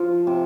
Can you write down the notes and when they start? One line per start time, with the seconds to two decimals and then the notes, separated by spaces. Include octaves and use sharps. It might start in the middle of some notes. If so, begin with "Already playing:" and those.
Already playing: F3
0.27 C3